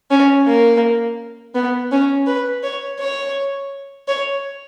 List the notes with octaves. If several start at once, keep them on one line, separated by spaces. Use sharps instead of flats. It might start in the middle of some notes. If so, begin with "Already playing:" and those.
C#4
A#3
B3
C#4
B4
C#5
C#5
C#5